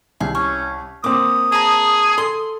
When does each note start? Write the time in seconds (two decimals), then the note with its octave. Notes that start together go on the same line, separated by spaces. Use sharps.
0.20 C2 G#4
0.35 C#4 C#6
1.04 A#3 C4 D6 D#6
1.52 G#4 A5 A#5
2.18 A4 C6